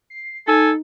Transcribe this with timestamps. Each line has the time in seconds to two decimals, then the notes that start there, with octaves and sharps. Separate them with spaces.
0.10 C7
0.48 D#4 A4 G#5